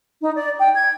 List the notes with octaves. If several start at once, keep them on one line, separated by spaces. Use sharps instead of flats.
D#4
D5
G5
G#6